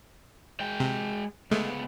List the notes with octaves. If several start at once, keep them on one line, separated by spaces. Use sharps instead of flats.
G#3 G5
C3
C#2 G#3 A3 B3